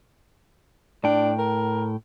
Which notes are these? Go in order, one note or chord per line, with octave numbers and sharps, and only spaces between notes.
A2 D4 G5
A#4